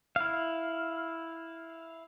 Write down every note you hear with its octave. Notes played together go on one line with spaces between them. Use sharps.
E4 F5